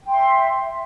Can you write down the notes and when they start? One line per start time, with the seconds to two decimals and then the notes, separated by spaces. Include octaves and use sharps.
0.03 G5
0.08 C6
0.13 E5